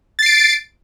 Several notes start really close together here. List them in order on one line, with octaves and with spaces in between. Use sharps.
A6 C7 D7